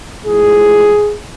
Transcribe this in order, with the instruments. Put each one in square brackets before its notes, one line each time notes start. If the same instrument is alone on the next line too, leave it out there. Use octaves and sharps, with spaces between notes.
[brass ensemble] A2 F3 G#3 G#4